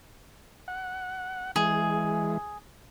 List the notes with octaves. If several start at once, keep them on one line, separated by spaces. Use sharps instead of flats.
F#5
E3 G#3 G#4